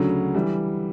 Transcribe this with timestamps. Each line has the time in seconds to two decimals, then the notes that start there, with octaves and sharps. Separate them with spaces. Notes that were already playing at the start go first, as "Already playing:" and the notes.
Already playing: D2 C#3 F#3
0.35 E3 G3